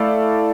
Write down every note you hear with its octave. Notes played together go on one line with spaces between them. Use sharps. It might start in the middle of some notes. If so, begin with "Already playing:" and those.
Already playing: A3 E4 A4 D5 F5